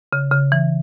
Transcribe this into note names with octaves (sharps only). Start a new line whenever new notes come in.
C#3
C#3
E3